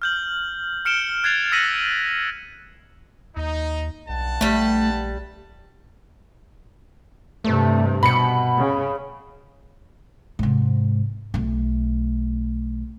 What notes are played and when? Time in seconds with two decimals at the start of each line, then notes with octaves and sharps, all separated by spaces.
0.02 F6 G6 F#7
0.85 F6 C#7 D7 E7 G7
1.24 F#6 G#6 A6 C7 F7
1.52 E6 A#6 B6 C#7 D#7 F#7
3.36 D#2 D#4
4.09 B1 G2 F#5 A5
4.41 A#1 G3 A3 B4
7.45 G2 C3 A3
8.03 B2 B5 C#7
8.57 C#3
10.39 G#2 C3
11.34 B1 A3